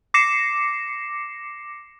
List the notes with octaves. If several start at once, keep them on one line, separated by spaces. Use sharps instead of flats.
D6 A#6 C7 C#7 E7